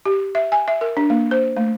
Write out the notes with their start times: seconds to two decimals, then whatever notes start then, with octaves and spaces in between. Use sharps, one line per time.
0.06 G4
0.35 E5
0.52 G#5
0.68 E5
0.81 A#4
0.97 D4
1.10 A#3
1.31 C5
1.57 A3